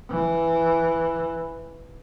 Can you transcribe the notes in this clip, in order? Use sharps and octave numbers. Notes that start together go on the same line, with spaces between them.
E3